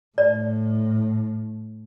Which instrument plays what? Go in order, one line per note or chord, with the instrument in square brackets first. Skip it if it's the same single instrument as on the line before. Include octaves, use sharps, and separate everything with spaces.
[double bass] A2 [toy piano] D5